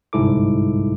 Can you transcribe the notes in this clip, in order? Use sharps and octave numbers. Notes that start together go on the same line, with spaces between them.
G1 C2 G#2 E4 A4 D6